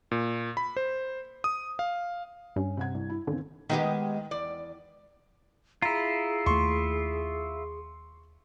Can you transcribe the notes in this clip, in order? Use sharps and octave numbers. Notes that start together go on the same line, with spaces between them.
A#2
B5
C5
D#6
F5
G2 C#4
C3 F#5 G#6
C2
E4
D#2 D3 C4
D#3 G#3 B3 G4
E2 D5
E4 F4 G#4 A#5
D#2 A3 C6 C#6